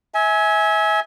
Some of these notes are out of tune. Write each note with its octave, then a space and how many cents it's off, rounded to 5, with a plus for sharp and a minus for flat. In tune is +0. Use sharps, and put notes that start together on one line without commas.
E5 -30 G#5 +10